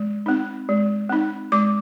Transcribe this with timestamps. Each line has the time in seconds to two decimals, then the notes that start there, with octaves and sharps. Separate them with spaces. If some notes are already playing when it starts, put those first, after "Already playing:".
Already playing: G#3
0.26 C4 D#4
0.69 G#3
1.09 C4 D#4
1.52 G#3 D6